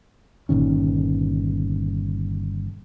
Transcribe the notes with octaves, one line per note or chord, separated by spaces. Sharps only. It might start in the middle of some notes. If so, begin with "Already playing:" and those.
G1 A#2 D#3 C#4